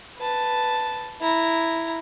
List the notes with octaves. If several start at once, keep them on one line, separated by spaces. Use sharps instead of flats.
B4 A5
E4 A#5